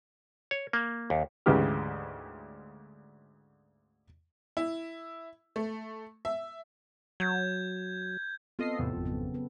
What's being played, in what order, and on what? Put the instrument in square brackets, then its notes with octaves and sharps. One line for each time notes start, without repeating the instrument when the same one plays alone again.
[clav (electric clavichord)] C#5
A#3
D#2
[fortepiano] D2 G#2 C#3 E3 G4 F6
[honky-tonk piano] E4
A3
E5
[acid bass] F#3 [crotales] G6 G#6
[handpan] B3 C4 A4 [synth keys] F4 D#5 C7
[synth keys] E2 A2 C3
G#1 F2
[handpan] C#3 F#3 B3
B3 B4